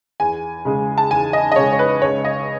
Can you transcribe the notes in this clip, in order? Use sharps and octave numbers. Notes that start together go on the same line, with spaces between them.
E2 G#5
C#3 G#3
A5
E2 G#5
D#5
D#5
C#3 G#3 C#5
C#5
B4
C#2 C#5
D#5